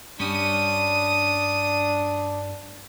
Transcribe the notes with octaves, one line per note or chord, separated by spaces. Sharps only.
G2 G3 C#4 D4 D#6